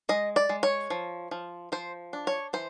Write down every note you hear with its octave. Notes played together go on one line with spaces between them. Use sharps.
G#3 D#5
D5
G#3
C#5
F3
F3
F3 C5
D4
C#5
E3 C5